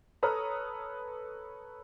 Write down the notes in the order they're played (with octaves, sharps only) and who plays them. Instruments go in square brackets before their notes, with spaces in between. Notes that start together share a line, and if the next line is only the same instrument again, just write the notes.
[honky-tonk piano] A4 B4 C#5 A#5 D#6 F6